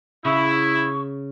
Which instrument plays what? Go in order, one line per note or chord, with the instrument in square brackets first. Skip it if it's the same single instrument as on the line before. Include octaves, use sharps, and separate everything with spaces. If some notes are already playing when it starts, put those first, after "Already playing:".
[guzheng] C#3 [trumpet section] E4 [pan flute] C#6